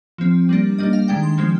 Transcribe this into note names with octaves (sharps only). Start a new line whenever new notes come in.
F3 C4
G3 A#3 D4
G3 A#3 D4 D#5
F5
D#3 G#3 D4 G5
C6
F3 G#3 C4